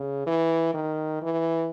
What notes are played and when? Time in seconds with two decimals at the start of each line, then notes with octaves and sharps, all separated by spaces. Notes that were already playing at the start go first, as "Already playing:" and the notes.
Already playing: C#3
0.26 E3
0.74 D#3
1.22 E3